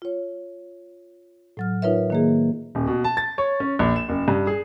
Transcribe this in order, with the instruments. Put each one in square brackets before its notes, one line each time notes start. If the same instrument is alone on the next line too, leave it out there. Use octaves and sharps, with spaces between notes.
[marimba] F4 C#5
A2 F#3 F6
D#4 F4 A#4 B4 C#5 E5
D#3 A#3 G#4
[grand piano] D#1
B2
A5
A6
C#5
C#4
A#1
E7
F#1
G2
G#4